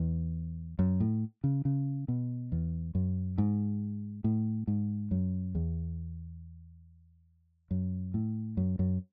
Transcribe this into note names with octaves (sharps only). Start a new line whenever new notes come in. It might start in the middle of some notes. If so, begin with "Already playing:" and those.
Already playing: E2
F#2
A2
C#3
C#3
B2
E2
F#2
G#2
A2
G#2
F#2
E2
F#2
A2
F#2
F#2